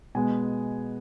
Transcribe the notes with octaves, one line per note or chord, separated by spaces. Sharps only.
B2 G#3 B3 G#5